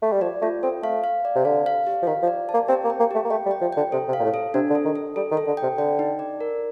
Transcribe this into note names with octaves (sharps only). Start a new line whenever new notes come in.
A3
G3
F3 D5
A3 F4
C4 A4
A3 F5
F5
D5
C3
D3 F5
F5
G4
F3
D#3 F5
F3
D5
A5
A#3
C4 G4
A#3
G5
A#3
A3 G4
A#3
A3 G5
G3
G5
F3
D3 G5
C3 A4
C3
F5
A#2
A2
A4
C3 D4
D3
A4
D#3
A4
G3 A4
D#3
A4
D3
G5
C3
D3 G5
D#4
D5
A#4